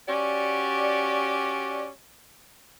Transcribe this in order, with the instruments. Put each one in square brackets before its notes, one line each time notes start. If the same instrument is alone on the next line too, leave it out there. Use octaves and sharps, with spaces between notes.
[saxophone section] C#4 F#4 G4 D5